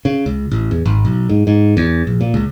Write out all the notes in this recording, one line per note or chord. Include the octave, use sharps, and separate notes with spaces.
C#3
C#2
A1
E2
G#1
B1
G#2
G#2
E2
A#1
A#2
C#2